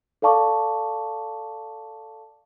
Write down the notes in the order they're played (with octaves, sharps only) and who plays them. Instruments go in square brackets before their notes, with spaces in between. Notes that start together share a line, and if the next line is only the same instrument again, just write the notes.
[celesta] A4 D5 F5 A5 C#6 D6